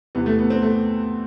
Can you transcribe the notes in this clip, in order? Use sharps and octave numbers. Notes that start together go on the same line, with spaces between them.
E2 C3 E3 B3
A3
B3
C4
A3